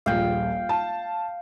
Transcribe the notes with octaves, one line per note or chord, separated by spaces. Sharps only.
D#1 A#1 F5 G5
A5